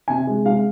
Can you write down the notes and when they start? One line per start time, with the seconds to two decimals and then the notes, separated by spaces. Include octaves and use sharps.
0.08 C3 G#5
0.27 G#3
0.46 G#3 F5